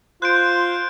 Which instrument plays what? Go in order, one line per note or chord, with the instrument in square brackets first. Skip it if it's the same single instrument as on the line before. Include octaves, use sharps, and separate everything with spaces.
[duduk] F4 [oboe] C5 [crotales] F#6 G6 D7